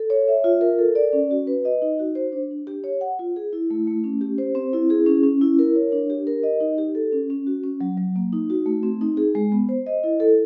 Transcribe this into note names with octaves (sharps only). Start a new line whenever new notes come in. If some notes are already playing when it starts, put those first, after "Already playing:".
Already playing: A4
C#5
E5
F4
A#4
A4
D5
C#4
F#4
B4
D#5
D#4
F#4
C5
D4
D4
G4
C#5
F#5
F4
G#4
E4
A3
A3
C#4
G4
C5
C4
E4
G#4
C#4
C#4
E4
A#4
C#5
D4
G4
A#4
D#5
D#4
G4
A4
C#4
C#4
F#4
C#4
F#3
F#3
A#3
D#4
F#4
A3
C4
D#4
G#4
G#3
B3
C5
D#5
E4
A4